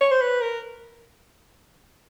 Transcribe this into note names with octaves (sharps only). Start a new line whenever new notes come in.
C#5
C5
B4
A#4